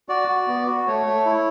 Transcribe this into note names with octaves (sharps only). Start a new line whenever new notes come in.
F#4 D5
F#4
B3
F#4
A3 C#5
A3
E4